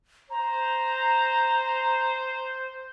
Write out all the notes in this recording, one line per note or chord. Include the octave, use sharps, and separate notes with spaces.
C5 A#5